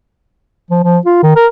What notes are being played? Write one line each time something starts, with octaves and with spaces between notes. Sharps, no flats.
F3
F3
F4
D#3
A#4